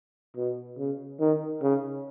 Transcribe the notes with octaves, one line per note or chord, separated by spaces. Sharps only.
B2
C#3
D#3
C#3